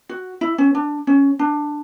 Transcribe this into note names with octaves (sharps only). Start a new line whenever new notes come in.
F#4
E4
C#4
D4
C#4
D4